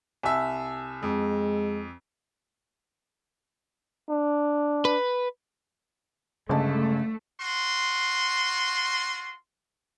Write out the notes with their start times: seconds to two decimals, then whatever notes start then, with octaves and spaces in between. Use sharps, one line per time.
0.23 C2 E5 G#5 A5 E6
1.03 F2 G#3
4.09 D4
4.85 B4
6.49 G1 C#3 G#3 A3 A5
7.39 F4 F#4 C6